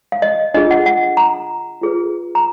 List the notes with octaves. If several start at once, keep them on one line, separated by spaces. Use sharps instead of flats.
F5
D#5
D4 F4 G#4 D#5
F#5
F#5
A#5
F4 G#4 B4
A#5